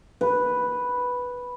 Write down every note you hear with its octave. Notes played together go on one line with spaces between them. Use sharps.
B4